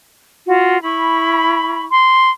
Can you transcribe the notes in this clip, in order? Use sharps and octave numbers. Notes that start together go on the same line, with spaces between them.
F4 F#4
E4 B5 C#6
C6